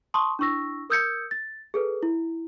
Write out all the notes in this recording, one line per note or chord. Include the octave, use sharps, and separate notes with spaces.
A5 C6 C#6 D#6
D4 E4 C#6 E6 A#6
A#4 D#6 E6 G6 G#6 C#7
A6
G#4 A4 B4
E4